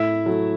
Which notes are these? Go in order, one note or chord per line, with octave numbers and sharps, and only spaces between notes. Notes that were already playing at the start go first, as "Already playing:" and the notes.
Already playing: A2 E4 E5
F#3 A3